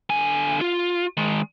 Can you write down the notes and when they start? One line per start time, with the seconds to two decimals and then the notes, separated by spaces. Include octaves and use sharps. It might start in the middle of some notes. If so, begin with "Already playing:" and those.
0.10 D3 G#5
0.61 F4
1.17 D#3 G#3